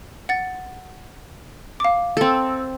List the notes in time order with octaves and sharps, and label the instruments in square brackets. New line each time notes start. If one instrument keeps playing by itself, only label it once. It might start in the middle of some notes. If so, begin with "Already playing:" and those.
[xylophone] F#5 A6
F5 D6
[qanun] C4 A4